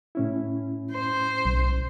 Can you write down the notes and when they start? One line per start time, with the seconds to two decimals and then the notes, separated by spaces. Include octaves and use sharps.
0.15 A2 C#4 E4
0.93 C5
1.45 B1